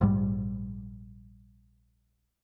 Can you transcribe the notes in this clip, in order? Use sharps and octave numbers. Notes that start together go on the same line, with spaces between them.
A#1 G#2 G3